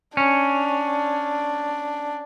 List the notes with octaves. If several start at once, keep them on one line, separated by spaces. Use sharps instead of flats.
C#4 D4